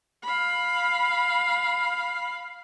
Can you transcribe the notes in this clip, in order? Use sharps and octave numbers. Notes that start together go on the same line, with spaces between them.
F5 B5